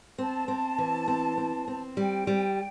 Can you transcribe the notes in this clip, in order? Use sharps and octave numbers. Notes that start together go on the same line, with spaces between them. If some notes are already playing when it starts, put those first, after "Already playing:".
C4 A5
C4
E3
C4
C4
C4
G3 G5
G3